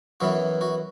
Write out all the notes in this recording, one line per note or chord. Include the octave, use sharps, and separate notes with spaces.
F#2 E3 B3 F#4
F#4